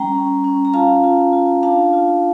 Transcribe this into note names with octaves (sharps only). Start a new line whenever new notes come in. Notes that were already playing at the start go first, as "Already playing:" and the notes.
Already playing: G3 C#4 G5 A#5
C#4
C#4
A#5
F4 F5 A5
F4
F4
D4 F5 A5
F4